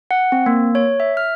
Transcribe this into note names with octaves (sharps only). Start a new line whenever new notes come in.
F#5
C4
A#3
C#5
E5
F6